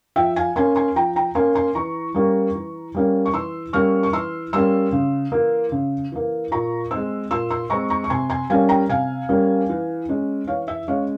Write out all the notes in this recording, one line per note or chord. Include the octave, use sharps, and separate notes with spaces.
F3 E5 G5
F5 G#5
A#3 C#4 G#5 C6
G#5 C6
F3 G5 A#5
G5 A#5
A#3 C#4 G#5 C6
G#5 C6
E3 A#5 C#6
G3 A#3 C#4
E3
G3 A#3 C#4
C#6
E3 C6 E6
G3 A#3 C#4 C#6 F6
C#6
E3 C6 E6
G3 A#3 C#4 C6 E6
C#3
E3 A#3
C#3
E3 A#3
A#2 A#5 C#6
G#3 C4 C6 E6
A#2 C6 E6
C6 E6
G#3 C4 A#5 C#6
A#5 C#6
C#6
C3 G#5 C6
G#5 C6
G3 A#3 C#4 F5 G#5
G5 A#5
C3 F5 G#5
G3 A#3 C#4
E3
G#3 C#4
E3 C#5 F5
E5
G#3 C#4 C#5 F5